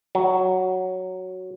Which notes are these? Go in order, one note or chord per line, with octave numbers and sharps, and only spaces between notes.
F#3